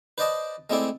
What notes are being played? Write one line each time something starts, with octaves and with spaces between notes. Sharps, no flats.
B4 C5 D5 D#5 A5
G#3 A3 C4 E4 D5